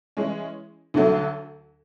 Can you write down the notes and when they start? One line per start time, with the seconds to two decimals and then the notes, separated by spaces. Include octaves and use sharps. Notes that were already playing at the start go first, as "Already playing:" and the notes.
0.17 E3 G#3 C#4
0.94 D2 D3 F#3 A3